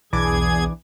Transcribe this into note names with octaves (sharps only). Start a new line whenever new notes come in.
B1 E2 E3 D4 G#4 D6 G#6